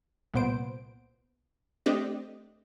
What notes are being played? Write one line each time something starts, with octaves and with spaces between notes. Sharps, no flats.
C2 A#2 B3 C5 D7
A3 C4 D4 G4 D5 D#5